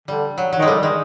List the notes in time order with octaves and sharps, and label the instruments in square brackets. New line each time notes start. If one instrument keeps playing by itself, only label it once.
[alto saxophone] D3 [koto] G3
[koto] F#3
F#3
[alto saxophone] D#3 [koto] G#3
[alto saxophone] D3 [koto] G3
[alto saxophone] D#3 [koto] G#3